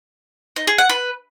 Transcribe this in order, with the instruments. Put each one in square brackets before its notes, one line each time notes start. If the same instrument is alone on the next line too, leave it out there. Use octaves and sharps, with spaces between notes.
[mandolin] D#4
G#4
F#5
B4